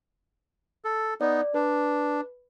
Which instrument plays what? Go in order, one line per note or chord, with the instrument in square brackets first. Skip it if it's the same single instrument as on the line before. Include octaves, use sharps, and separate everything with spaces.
[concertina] A4
[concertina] B3 D#4 [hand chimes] D5
[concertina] D4 [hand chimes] B4